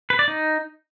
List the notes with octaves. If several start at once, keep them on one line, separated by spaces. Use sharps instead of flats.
B4
D5
D#4